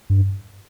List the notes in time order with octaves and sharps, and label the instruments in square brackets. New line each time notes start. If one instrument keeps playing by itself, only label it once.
[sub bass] G2